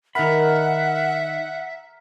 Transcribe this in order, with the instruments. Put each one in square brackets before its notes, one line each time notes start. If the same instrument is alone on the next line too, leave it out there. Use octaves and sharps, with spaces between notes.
[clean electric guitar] D#3 B5 [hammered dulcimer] A#4 [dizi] E5 [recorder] F#5